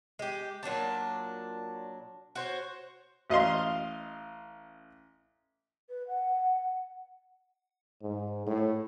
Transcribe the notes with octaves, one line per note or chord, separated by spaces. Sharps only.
G#3 G4
A#2 F#3 D4 A5
F#4 C5 C#5
A1 D#5 F5 C6
B4
F#5
G#2
A2